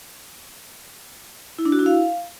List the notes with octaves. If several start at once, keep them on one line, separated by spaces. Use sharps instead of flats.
E4
D4
F#4
E4
F5